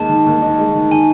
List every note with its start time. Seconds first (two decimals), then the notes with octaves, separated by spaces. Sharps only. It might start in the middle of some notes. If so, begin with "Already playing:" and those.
Already playing: D#2 G#3 A5
0.09 D#3
0.26 D#2
0.42 D#4
0.58 G#3
0.75 D#3
0.91 D#3 G#5